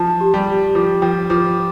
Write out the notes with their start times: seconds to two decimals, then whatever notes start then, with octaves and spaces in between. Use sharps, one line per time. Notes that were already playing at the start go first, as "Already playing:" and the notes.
Already playing: F3 A5
0.21 G4
0.34 G3
0.47 G4
0.75 F3 D6
1.02 F3 G5
1.30 F3 D6